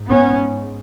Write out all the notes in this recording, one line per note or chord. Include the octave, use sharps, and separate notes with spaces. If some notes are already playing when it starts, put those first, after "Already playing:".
Already playing: G#2
B3 C#4